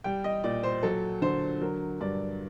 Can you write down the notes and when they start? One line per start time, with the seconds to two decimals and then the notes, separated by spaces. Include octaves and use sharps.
0.04 G3 G5
0.24 D#5
0.44 A#2 D5
0.63 C5
0.83 F#3 A4
1.22 D3 C5
1.61 F#3 A#4
2.00 G2 D5